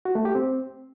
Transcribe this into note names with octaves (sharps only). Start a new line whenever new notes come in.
F#4
A3
G4
C4